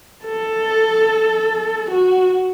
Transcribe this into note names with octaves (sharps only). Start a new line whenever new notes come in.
A4
F#4